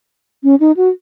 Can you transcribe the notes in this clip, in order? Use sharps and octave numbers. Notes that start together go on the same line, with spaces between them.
C#4
D#4
F#4